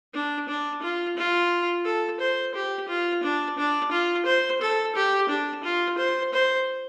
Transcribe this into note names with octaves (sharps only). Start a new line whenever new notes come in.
D4
D4
F4
F4
A4
C5
G4
F4
D4
D4
F4
C5
A4
G4
D4
F4
C5
C5